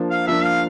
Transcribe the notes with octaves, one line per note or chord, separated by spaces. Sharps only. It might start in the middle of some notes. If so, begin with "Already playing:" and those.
Already playing: F3 A#3 D4
F5
F3 A#3 D4 E5
F5